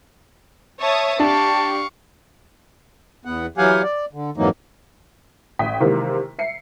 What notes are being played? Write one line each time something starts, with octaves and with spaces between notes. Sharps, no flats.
C#5 E5 A5 D#6
D4 G4 F5 A5 C#6
E2 B3 F#5
E3 F#3 G4 F5 F#5 G#5
D5
D3
F2 G#2 E3 F#3 A#3 D#4
A1 G5 D#6 B6
C3 D#3 E3 G#3 A#3
E5 C7 C#7